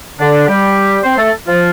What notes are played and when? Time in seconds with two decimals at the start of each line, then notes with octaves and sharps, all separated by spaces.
0.19 D3 D4
0.47 G3 G4
1.03 C4 C5
1.18 A3 A4
1.47 F3 F4